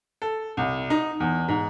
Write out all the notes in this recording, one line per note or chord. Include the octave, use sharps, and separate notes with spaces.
A4
C2
D#4
E2
G#2